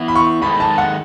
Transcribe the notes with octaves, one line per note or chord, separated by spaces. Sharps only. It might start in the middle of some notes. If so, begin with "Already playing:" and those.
Already playing: E3 B3 E4
B5
C#6
G#2 D#3 G#3 D#4 A4 B5
A5
F#5